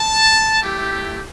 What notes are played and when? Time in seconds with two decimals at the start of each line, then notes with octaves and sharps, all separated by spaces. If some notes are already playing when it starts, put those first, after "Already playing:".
Already playing: A5
0.62 A3 E4 G4